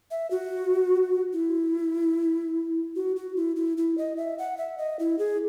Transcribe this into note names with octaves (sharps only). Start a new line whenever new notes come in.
E5
F#4
E4
F#4
F#4
E4
E4
E4
D#5
E5
F#5
E5
D#5
E4
G#4